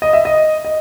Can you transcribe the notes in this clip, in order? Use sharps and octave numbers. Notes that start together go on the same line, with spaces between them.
D#5
E5
D#5
D#5